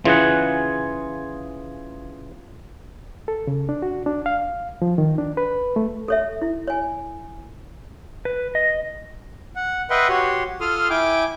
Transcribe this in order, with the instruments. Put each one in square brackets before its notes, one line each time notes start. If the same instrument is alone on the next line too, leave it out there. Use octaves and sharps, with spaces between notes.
[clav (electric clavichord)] C#3 E3 [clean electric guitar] F4 G#4 F#5
[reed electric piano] A4
C#3
D4
F#4
D4
F5
F3
D#3
D4
B4
A3
[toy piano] A4 C#5 E5
E4
C#5 G#5
[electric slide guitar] B4
D#5
[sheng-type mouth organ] F#5
B4 D#5 E5 F#5 G5 C6
F#4 G4 C#5 C6
F4 A4 F5 C6 D#6 F6
E4 G5 G#5 D6